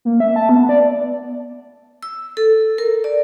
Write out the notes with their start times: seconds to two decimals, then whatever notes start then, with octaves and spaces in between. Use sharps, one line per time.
0.05 A#3
0.20 E5
0.36 A5
0.49 B3
0.69 D5
2.03 E6
2.37 A4
2.78 A#4
3.04 D5